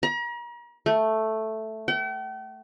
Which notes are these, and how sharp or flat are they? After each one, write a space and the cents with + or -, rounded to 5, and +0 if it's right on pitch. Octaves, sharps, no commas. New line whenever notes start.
A#5 +40
A3 +0
G5 -45